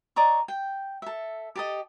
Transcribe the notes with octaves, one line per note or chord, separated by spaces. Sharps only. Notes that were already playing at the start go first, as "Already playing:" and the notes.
D5 D#5 A#5 C#6
G5
A4 E5
G4 A4 D#5